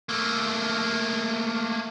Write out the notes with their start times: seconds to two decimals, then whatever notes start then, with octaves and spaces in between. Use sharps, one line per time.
0.09 A3 A#3